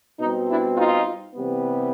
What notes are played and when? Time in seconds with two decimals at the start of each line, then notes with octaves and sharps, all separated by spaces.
0.20 B2 G3 C4 D#4
0.49 D4 E4
0.77 D#4 F4
1.35 C3 E3 G3 B3